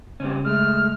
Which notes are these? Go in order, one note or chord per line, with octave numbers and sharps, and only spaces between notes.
C#3 G3 C4 C#4
G#3 A3 F6